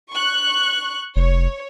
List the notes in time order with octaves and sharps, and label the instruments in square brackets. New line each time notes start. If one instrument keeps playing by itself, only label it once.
[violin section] C#6 F#6
[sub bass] F1 [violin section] C#5